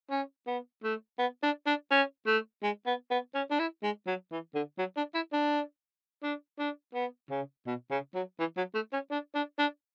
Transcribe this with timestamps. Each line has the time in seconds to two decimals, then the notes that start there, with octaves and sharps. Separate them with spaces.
0.10 C#4
0.47 B3
0.83 A3
1.19 B3
1.43 D4
1.66 D4
1.91 C#4
2.26 A3
2.63 G#3
2.87 B3
3.11 B3
3.35 C#4
3.51 D4
3.59 E4
3.83 G#3
4.07 F#3
4.31 E3
4.55 D3
4.79 F#3
4.97 D4
5.15 E4
5.33 D4
6.23 D4
6.59 D4
6.94 B3
7.30 C#3
7.67 B2
7.91 C#3
8.15 F#3
8.39 E3
8.57 F#3
8.75 A3
8.93 C#4
9.11 D4
9.35 D4
9.59 D4